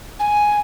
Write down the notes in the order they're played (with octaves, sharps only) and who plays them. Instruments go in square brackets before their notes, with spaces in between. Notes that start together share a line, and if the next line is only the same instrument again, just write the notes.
[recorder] G#5